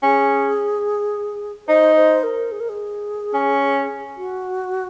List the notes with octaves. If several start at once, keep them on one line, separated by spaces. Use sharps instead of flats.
C#4 G#4
D#4 C5
C5
A#4
G#4
A#4
G#4
C#4
F#4